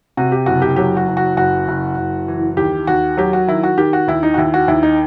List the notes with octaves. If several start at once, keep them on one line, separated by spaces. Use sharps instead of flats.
C3 F#4
G4
F#1 F#4
G4
F#3 G4
F#4
F#1
F#4
F#1 F#4
F#1
F#1
E3
D#2 G4
D#2 F#4
F#3 G4
F#4
D#3 E4
F#4
D#3 G4
F#4
D#2 E4
D#4
F#4
D#2 E4
F#4
D#2 E4
D#4